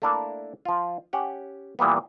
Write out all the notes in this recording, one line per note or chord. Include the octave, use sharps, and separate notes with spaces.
A3 A#3 D4 E4 A#4
F3 F4
C#4 G4 F#5
A#2 E3 G3 A#3 B3